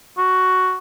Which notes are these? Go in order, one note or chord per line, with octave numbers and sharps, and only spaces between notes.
F#4